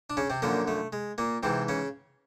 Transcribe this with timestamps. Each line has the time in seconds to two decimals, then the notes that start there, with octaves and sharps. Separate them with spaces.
0.10 D4
0.17 C#3 C#4
0.30 C3 C4
0.42 F#2 A#2 D3 F3 A#3
0.68 A3
0.93 G#3
1.18 A#2 A#3
1.43 G#2 C3 E3 C4
1.68 C#3 C#4